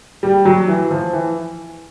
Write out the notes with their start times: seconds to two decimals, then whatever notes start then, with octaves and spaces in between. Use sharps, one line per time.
0.23 G3
0.45 F#3
0.68 E3
0.91 F3
1.13 E3